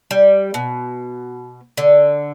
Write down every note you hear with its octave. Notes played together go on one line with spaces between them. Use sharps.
G3
B2
D3